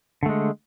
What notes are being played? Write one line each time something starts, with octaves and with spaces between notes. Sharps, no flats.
D3 G#3 A3